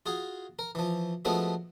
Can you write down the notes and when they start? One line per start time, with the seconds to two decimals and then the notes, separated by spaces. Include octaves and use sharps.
0.06 F4 F#4 G#4
0.59 A#4
0.75 E3 F3
1.25 F3 G#3 A3 B3 C#4 F#4